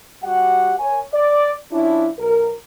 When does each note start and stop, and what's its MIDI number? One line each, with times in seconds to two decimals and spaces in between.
0.23 0.75 55
0.23 0.75 66
0.23 0.75 67
0.23 0.75 78
0.79 1.01 70
0.79 1.01 73
0.79 1.01 80
1.14 1.52 74
1.72 2.09 53
1.72 2.09 61
1.72 2.09 62
1.72 2.09 64
2.19 2.50 35
2.19 2.50 70